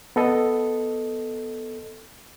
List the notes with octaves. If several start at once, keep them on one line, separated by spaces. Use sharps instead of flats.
B3 A4 D#5